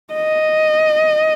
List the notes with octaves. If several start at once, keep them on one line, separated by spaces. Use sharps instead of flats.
D#5